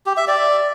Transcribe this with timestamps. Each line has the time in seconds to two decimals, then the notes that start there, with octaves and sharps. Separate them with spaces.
0.06 G4
0.17 E5
0.28 D5